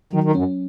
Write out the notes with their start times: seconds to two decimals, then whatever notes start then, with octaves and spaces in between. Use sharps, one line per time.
0.13 D#3 F#3
0.23 D#3
0.35 F#2 C#4